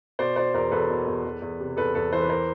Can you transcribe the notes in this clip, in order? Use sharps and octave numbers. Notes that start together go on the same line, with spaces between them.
B2 C5 D5
B2 C5 D5
E2 A#4 C5
E2 A4 B4
B2
E2
E2
E2
C3
E2 A4 B4
E2 A4 B4
E3 C5
B4
A#4 C5